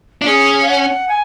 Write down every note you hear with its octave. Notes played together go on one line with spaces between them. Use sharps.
D4
C#4 G#4
F5
F#5
G#5